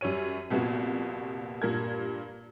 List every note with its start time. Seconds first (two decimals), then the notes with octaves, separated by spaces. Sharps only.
0.01 F#2 G3 C#5 D#7
0.50 C2 F2 A#2 B3 F#4
1.62 G2 A#2 A#4 G#6